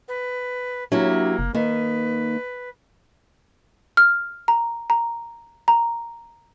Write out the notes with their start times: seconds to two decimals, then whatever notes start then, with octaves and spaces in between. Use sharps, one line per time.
0.08 B4
0.92 F#3 A#3 D4 E4 G4
1.39 F#1
1.55 D#3 A#3 B4
3.97 F6
4.48 A#5
4.90 A#5
5.68 A#5